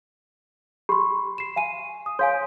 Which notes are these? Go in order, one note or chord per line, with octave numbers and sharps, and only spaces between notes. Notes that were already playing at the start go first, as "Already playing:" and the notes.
G4 B5 C6
C7 E7
F5 G#5 D#7
D#6
C#5 F5 G#5 C6